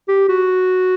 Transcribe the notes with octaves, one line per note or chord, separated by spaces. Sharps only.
G4
F#4